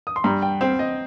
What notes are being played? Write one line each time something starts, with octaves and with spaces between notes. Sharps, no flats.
D#6
C6
G2 A#5
G5
C4 G5
D#5